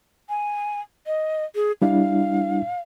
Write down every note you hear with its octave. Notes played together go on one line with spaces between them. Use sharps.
G#5
D#5
G#4
G3 D4 E4 F5